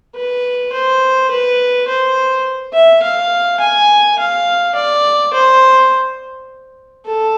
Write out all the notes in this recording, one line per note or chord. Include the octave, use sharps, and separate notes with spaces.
B4
C5
B4
C5
E5
F5
G#5
F5
D5
C5
A4